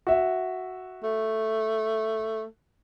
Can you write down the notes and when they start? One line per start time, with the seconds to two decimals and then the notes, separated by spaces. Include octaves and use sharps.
0.07 F#4 E5
1.03 A3